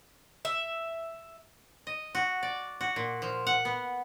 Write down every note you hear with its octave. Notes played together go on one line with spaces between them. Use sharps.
E5
D#5
F#4
D5
F#4
A#2
F3
F#5
B3